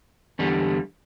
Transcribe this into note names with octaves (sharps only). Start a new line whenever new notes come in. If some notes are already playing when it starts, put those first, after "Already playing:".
E2 D3 G3